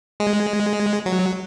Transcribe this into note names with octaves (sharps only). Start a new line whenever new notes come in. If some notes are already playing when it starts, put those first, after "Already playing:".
G#3
F#3